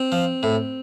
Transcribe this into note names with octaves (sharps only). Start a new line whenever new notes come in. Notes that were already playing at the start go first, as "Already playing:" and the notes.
Already playing: C4
F3
A2